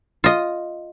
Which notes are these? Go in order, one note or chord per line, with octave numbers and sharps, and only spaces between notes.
F4 D#5